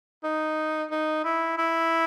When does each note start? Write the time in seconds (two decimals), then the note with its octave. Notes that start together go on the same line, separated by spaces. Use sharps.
0.24 D#4
0.91 D#4
1.24 E4
1.58 E4